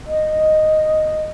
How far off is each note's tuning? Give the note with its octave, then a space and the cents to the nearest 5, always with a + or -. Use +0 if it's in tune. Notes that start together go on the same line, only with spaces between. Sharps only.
D#5 -5